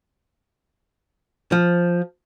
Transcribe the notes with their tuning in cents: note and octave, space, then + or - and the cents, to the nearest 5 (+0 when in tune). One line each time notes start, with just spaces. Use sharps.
F3 +0